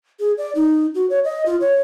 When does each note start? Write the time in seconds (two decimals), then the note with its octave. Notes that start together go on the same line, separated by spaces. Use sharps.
0.20 G#4
0.38 D5
0.55 D#4
0.95 F#4
1.10 C#5
1.24 D#5
1.46 F4
1.60 C#5